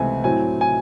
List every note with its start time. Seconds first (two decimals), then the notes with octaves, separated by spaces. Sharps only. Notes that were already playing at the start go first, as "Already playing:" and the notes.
Already playing: C#2 C3 E3 A3 C4 G#5
0.24 A2 F#3 C4 G#5
0.61 G#5